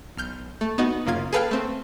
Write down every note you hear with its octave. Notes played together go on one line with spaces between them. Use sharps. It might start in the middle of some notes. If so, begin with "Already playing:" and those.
B1 F6 G6
A3
B3 D#4 F#4
F#2 C#3 A#3 F4 G#6
G#4 A4 B4 F5 G5 F6
A3 C4